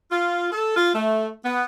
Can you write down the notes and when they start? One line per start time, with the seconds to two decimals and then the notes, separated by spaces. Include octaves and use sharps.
0.11 F4
0.51 A4
0.76 F4
0.93 A3
1.44 B3